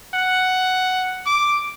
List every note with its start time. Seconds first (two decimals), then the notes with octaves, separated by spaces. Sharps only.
0.14 F#5
1.26 D6